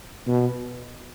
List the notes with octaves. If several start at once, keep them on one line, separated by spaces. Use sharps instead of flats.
B2